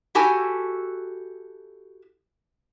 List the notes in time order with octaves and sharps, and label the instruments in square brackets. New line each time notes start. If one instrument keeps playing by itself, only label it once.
[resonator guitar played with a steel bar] E4 F#4 G4 A4 G#5 A5